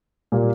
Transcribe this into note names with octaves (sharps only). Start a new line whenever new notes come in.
A#2 G3 A#3